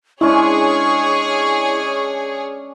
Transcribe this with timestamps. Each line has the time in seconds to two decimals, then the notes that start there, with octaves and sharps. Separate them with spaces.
0.21 G#3 C#4 D4 E4 G#4 C#5 C#6